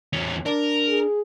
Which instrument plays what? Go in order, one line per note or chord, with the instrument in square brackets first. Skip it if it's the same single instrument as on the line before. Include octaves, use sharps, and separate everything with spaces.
[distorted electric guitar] E2 C#4
[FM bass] D4 [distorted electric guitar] A#4
[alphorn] G#4